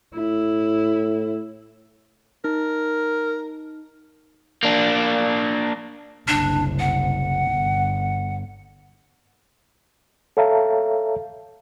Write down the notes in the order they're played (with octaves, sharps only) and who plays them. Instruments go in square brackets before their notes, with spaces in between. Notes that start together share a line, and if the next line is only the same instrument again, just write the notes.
[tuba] A2 [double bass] E4
[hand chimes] D#4 [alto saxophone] A#4
[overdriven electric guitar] A#3 D4
[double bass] F#1 C2 [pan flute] D4
[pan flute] F#5
[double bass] G1
[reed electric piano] A4 C#5 E5 F5 A5 A#5